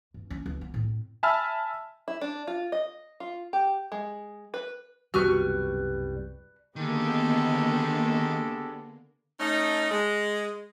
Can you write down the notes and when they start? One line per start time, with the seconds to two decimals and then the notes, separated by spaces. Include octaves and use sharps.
0.14 G2
0.30 C#4 D4
0.46 C#2
0.61 B3
0.74 A2 C4
1.23 E5 G#5 A5 B5 E6 F6
2.08 E4
2.21 D4
2.47 F4
2.72 D#5
3.20 F4
3.53 G4
3.92 G#3
4.54 B4
5.14 C2 F#2 B2 G3 F#4 B4 C#6 F6
6.76 D3 D#3 G#3 A#3 B3 G4 A4
9.39 A3 C#4 D#4
9.91 G#3